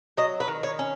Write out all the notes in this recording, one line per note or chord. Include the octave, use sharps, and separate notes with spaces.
F#3 D#5
B4
D#3
C#5
C#4